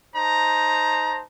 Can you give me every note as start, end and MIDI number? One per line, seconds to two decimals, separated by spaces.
0.14 1.22 63
0.14 1.22 72
0.14 1.22 81
0.14 1.22 82